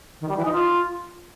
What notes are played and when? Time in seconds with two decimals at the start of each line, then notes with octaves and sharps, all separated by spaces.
0.21 D#3
0.29 G3
0.37 E3
0.45 D#4
0.53 F4